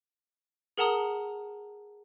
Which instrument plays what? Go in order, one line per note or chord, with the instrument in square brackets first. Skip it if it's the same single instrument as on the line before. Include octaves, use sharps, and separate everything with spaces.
[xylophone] G#4 A#4 F#5 A5 A#5 D#6